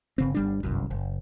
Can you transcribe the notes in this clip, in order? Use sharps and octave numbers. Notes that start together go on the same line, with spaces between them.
G1 C#3 C4
G1 G3 D4
G1 C2 F#2
F#1